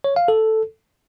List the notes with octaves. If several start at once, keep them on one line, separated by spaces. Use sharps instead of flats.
C#5
F5
A4